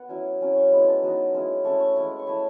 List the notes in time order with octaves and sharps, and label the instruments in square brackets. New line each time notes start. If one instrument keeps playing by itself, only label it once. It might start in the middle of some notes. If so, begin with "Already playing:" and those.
Already playing: [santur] B3 F#5
F#3 C#4 E4 G#5
F#3 C#4 E4
C#6
G#3 B3 E4 B5
A5
F#3 B3 D#4
G#3 C#4 E4
A3 C#4 E4 C#6
C#6
G#3 C#4 E4 B5
C#6
A3 E4 B5